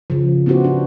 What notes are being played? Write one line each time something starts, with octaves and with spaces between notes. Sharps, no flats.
C#3 F3
B3 C#4 E4 F#4 G4 C5
D4